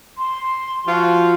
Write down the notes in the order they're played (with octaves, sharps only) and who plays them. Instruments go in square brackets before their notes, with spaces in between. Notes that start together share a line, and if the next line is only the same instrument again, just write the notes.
[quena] C6
[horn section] F3 F4 F#4